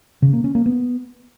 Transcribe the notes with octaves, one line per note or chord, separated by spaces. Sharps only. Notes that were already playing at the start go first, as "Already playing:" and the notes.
C#3
A#3
C#4
A#3
B3